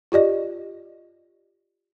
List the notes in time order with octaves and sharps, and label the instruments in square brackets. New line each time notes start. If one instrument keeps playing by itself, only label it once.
[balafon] F4 G4 D5 D#5